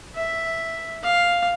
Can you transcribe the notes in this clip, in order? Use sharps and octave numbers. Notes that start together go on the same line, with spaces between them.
E5
F5